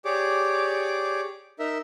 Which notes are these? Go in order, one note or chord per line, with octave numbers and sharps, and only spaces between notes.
G4 G#4 C#5 D5 D6
D#4 A#4 E5